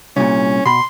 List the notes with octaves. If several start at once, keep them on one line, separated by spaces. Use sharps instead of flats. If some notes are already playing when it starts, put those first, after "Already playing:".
C2 A#2 C#4
B2 B5 C6